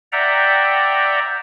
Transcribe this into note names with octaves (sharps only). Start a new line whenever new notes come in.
D5 E5 F#5 G5 A#5